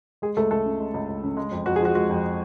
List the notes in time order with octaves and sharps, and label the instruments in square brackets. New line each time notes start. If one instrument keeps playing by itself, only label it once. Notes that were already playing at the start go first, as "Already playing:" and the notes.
[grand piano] G#3 G#4
C#2 A3 A4
C#2 A3 A4
C#3
G#3
C#2
C#2
C#3
G#3
F2
F2 F#4
G#4
F3
F#4
G#3 F#4
F2